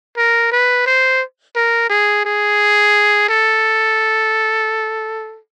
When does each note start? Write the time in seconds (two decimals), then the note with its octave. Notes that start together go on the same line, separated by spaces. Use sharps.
0.17 A#4
0.52 B4
0.86 C5
1.56 A#4
1.90 G#4
2.25 G#4
3.29 A4